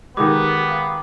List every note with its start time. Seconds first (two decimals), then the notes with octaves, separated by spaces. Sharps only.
0.17 D#3 G#3 B3 G4 D6
0.69 F5